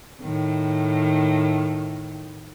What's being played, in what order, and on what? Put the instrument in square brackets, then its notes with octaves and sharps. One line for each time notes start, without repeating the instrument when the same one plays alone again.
[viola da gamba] A2 D#3